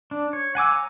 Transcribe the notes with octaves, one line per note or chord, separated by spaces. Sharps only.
D4
C#5
F#5 G#5 D6 E6
C#5 G#5 A#5